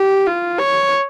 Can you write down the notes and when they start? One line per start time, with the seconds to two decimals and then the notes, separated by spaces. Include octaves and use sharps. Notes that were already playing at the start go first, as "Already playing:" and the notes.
Already playing: G4
0.27 F4
0.59 C#5